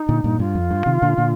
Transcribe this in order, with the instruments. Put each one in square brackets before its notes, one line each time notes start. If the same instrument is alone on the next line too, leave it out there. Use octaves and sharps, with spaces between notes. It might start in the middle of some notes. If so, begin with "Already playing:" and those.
Already playing: [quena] D#4
[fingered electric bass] A#2 D3
G2 A#2
[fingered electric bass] G2 [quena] F4
[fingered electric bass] F2
G2
C3 D#3
A#2 D3
A#2 D3